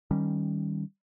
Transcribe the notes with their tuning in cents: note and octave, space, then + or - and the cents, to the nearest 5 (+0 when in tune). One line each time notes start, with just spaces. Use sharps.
D#3 +0 G3 +0 C#4 +0